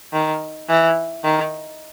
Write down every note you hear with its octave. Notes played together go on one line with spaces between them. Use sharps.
D#3
E3
D#3